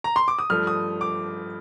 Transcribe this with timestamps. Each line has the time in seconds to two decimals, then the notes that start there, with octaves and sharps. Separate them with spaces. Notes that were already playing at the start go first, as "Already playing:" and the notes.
0.04 A#5
0.16 C6
0.28 D6
0.39 D#6
0.50 G2 F3 A3 F6
0.67 D#6
1.01 D6